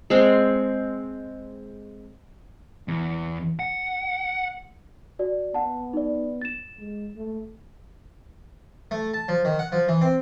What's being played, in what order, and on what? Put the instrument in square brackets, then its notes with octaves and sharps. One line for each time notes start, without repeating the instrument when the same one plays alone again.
[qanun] G#3 C4
[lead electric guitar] E2
F#5
[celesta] F#4 D5
[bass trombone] B3 [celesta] F#5 A5
[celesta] D#4 D5
A6 E7
[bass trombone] G#3
A3
[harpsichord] A3
A5
F3
D#3
F#5
F3
E3
C4